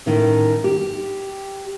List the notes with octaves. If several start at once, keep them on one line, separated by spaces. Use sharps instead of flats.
A2 D#3 C#4
G4